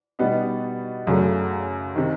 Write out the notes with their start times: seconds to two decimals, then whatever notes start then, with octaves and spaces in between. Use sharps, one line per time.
0.19 B2 G3 B3 D#4
1.07 F#2 C#3 F#3 A3
1.96 C3 D#3